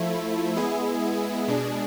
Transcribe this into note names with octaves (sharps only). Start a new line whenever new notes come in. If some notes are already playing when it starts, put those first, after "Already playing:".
Already playing: F3 A3 E4
G#3 B3 E4 G#4
B2 G#3 D4 G#4